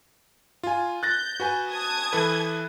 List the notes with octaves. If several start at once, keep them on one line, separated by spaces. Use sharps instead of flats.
F4 G#5
F#6 G6 A6 A#6
F#4 B4 G#5
A5 D#6 G#6
E3 A4 B4